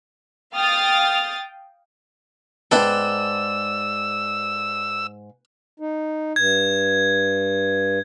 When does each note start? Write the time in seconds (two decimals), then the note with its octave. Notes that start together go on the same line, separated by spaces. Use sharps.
0.54 F5 G5 D#6 F6 A6
2.71 D#2 G#2 B4 D5 G5 A5 E6
5.80 D#4
6.36 G2 G#6